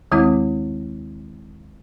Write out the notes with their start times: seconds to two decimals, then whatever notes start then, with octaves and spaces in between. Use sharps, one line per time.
0.11 D#2 D#3 G#3 C4 E4